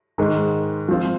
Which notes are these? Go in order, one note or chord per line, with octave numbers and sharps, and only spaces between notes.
G#2 D#3 G#3
F3 C4 F4